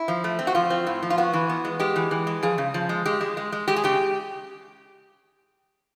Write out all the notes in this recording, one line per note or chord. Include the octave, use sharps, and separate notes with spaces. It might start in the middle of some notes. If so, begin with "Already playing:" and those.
Already playing: E4
F3
A3
C4
F#4
F3 F4
C4
A2
F3
F4
B3 F#4
E3
B3
G#3
G#3 G4
E3
E3
G#3
F3 G#4
C#3
F3
G#3
G#3 G4
G#3
G#3
G#3
G#3 G4
G#4
C#3 G4